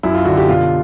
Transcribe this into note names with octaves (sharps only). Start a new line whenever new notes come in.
F#2 E4
F4
D3 F#4
G4
B2 F4